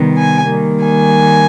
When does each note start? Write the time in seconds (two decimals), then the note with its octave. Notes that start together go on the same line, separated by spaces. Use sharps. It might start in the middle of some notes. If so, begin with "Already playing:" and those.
Already playing: C3 D#3 G3 B3
0.16 G#5
0.50 D#3 G3 A#3
0.84 G#5